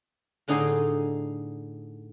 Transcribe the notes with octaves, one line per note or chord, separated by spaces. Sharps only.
A2 D3 D#4 G#4 D#5 C6